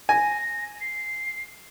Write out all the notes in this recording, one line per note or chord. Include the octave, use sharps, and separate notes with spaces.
G#5 A#6
C7